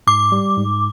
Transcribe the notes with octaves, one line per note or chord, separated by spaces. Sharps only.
G#2 D6
G3
G#2